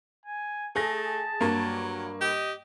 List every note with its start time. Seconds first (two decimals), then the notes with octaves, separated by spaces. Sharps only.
0.26 G#5
0.76 A3 G#4 A5 A#6
1.41 G2 F#3 A#3
2.21 G4 D#5